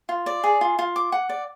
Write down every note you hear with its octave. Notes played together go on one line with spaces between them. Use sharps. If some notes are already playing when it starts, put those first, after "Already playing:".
F4
D5
G#4
F4
F4
D6
F#5
D5